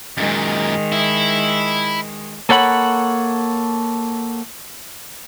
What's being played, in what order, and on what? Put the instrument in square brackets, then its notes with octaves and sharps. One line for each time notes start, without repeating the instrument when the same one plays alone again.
[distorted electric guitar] F#2 A#2 [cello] D#3 G#3
[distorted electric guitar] E4
[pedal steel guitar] A#3 A4 C#5 F#5 B5